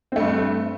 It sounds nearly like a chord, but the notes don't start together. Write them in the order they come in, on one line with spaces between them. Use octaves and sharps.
C4 A3 G2